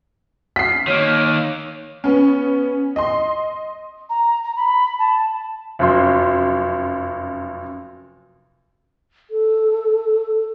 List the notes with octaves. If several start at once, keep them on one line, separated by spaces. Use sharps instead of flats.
B6 C7
D#3 A#3 C#5
B3 C#4
D#5 C6
A#5
A#5
B5
A5
F1 F#2 C6
A4